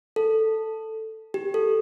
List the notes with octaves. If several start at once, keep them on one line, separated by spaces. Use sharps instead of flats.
A4
G4
A4